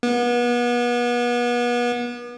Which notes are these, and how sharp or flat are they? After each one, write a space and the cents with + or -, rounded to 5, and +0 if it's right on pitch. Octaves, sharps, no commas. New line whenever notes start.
B3 -35